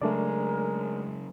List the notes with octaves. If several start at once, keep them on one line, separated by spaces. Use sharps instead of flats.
C#3 F#3 G#3 A3 D4 A#4 D5